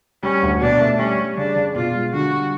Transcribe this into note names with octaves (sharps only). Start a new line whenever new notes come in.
G3 C#4
D2
B2 D4
A3
G3 C#4
G3
C#3 D4
C#3
B2 F4
G#3
D3 F#4
G3